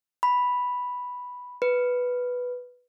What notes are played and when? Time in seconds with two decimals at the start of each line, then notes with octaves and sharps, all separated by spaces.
0.23 B5
1.62 B4